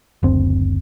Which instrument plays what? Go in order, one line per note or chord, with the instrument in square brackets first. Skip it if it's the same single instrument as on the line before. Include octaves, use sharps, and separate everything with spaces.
[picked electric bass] F#1 D2 C4